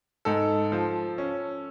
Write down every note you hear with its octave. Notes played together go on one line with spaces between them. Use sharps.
G#2 A4
F3
C#4